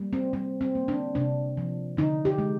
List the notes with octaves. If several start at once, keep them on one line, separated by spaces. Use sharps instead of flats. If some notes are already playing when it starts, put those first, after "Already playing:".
Already playing: G3 A#3
C4
G3 C4
C4
A#3
D4
C3 D4
F3
D3 D#4
G4
G#3